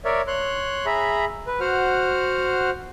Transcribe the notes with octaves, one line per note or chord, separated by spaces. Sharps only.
A#4 C#5 D5 E5
C#5 C6 F#6
G#4 E5 A#5 B5
B4
F#4 C5 F#5 F6